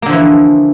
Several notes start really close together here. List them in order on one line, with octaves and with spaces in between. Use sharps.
A#3 D3 F3 E3